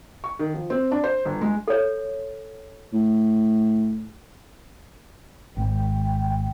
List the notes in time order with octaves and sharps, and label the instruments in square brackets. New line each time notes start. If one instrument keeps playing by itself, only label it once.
[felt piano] C#6
D#3
F3
C4
D4
C5
G1
G#3
[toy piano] A4 C#5
[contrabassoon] A2
[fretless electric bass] G#1 [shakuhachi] G5